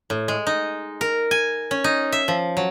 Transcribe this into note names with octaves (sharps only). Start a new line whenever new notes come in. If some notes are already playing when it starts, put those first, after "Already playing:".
A2
G#3
D#4
A#4
G#5
C#4
D#4
E5
F3
F#3